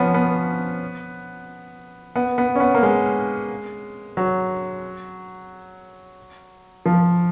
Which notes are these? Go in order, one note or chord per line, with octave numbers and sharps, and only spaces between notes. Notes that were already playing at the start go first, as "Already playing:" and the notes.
Already playing: F3 B3 C#4
B3
B3
B3
C#4
B3
A#3
G#3
F#3
F3